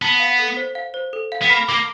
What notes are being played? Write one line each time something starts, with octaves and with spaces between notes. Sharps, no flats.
B3 A5
F5
A4
C5
F5
C5
A4
F5
B3
A#3 B5
A#3 D6